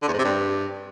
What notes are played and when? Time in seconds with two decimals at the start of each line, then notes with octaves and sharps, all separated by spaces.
0.02 D3
0.08 E2
0.13 G#2
0.19 C3
0.24 G2